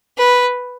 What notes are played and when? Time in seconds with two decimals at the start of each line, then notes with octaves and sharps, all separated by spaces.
0.17 B4